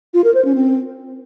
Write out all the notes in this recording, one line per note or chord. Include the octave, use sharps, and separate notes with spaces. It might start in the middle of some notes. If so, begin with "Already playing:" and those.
F4
A#4
C5
C#4
C4